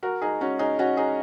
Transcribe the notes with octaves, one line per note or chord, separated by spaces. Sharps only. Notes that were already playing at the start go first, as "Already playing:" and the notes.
F#4 A#4
D#4 G#4
C#4 F#4
D#4 G#4
C#4 F#4
D#4 G#4